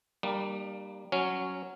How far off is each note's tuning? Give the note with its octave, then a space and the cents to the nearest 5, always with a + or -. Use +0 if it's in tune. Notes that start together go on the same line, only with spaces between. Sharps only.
G3 +0 A#3 +0 D4 +45
F#3 +0 C#4 +0